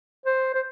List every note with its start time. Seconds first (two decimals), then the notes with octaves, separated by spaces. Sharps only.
0.26 C5
0.55 C5